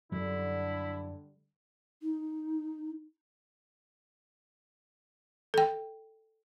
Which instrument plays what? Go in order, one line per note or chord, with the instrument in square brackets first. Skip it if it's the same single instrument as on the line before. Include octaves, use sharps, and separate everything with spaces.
[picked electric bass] F#2 F#3 [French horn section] D3 G3 [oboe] E4
[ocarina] D#4
[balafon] A4 G5